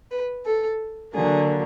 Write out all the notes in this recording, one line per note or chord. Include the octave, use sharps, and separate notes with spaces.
B4
A4
D3 F#3 A#3 G#4